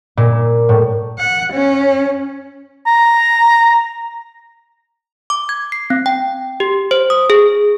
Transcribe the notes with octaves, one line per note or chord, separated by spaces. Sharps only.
A#2
A2
F#5
C#4
A#5
D6
G#6
C7
C4
G5
G4
C5
D#6
G#4